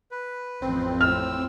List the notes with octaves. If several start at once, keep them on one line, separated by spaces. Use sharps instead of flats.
B4
A1 F2 F3 C4
A2 E6 F6